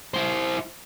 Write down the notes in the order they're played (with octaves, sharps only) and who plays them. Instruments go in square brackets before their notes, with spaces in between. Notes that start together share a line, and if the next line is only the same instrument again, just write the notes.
[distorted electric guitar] E4 C5